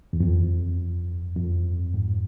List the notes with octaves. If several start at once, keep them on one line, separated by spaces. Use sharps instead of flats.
E2
F2
F2
G#2